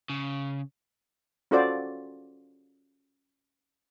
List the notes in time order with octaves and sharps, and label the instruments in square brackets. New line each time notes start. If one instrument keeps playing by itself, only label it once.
[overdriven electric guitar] C#3
[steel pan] C#4 F4 F#4 A4 C5 D5